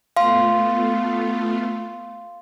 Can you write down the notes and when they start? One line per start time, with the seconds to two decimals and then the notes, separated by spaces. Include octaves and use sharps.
0.17 A3 B3 F4 F5 C6